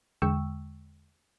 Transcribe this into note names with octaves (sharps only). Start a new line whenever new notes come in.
E2 D3 G#3 G5 C#6 E6